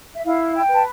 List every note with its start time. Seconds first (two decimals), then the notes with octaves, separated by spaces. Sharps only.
0.16 E5
0.25 E4 F5
0.55 G5
0.69 B4
0.74 A5